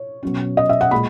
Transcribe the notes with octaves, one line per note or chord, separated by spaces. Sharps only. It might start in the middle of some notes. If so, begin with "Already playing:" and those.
Already playing: C#5
B2 F#3 C#4
D#5
E5
F#5
A#2 G#3 B5